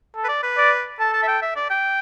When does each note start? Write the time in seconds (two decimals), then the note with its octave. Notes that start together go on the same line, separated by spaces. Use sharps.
0.15 A4
0.24 B4
0.28 D5
0.43 B4
0.58 D5
1.00 A4 A5
1.13 A5
1.23 E5
1.28 G5
1.42 E5
1.56 D5
1.70 G5